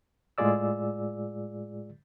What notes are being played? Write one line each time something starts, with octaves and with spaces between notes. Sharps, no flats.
A2 G#3 F4 G#4 D5 E6